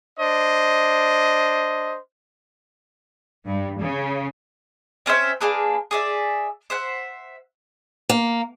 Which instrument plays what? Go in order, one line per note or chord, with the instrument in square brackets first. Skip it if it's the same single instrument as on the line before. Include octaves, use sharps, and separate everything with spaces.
[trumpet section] D4 C5 D#5
[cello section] G2
C#3
[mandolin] C4 C#4 C5 E5
A#3 D4 G#4 B4
G#4 D5 E5
C5 E5 F#5
[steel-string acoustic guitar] A#3